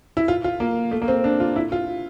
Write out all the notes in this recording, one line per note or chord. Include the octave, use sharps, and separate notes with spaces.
E4
F4
F4
A#3
A3
A#3
C4
D4
F4
E4
F4